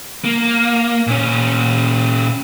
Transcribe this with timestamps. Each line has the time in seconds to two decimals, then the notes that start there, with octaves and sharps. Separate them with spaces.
0.24 A#3
1.07 A#2 C#4